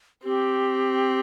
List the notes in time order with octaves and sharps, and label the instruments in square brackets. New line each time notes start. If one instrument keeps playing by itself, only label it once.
[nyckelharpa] C4 [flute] G4